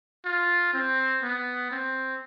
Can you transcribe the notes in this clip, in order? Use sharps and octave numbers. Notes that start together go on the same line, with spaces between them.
F4
C4
B3
C4